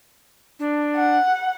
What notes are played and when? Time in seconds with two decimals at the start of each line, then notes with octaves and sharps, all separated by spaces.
0.59 D4
0.96 F#5